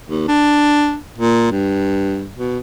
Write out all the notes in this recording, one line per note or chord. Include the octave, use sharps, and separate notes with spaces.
D#2
D4
A#2
G2
B2